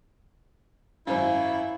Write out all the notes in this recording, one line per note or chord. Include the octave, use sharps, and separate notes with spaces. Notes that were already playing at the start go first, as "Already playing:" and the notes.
G#1 F#2 E4 C5 F5